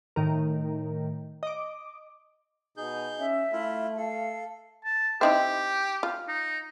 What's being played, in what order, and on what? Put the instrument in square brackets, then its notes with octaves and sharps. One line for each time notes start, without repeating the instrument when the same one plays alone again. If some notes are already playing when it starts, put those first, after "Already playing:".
[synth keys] A2 D#3 A#4
D#5 D6
[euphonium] B2 [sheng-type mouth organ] D#4 G#4 G6
[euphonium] C#4 [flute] E5
[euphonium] A3 [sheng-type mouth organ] E4 F4
[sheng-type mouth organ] A4 [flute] F5
[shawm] A5
[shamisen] C4 D#4 E4 [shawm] G4
[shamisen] F4
[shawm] D#4